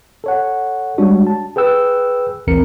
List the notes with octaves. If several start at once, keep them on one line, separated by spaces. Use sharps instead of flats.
A4 C#5 F#5
G3 G#3 D4 F#4 C#5
A5
G#4 B4 G5 E6 F#6
A#1 D#2 E3 C4 A#4 C#7